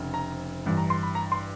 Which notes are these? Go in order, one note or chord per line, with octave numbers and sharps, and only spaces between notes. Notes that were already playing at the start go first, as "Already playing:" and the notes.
Already playing: F1 F2 C#3
A#5
A1 G2 E3
A#5
C6
B5
A#5
C6